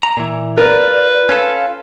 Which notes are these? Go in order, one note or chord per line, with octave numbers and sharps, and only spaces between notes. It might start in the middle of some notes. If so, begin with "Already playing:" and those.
A#5
A#2 E3
F4 A#4 B4 D5
C#4 F4 A4 F5